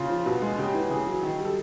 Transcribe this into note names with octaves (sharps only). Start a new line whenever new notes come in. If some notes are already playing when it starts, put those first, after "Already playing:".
Already playing: C#3 F4
F3
B2
G#3
C#3 G4
E3
C#3 G#4
F#3
D#3
G3
A4